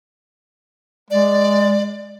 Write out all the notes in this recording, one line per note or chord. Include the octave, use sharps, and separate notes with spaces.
G#3 D5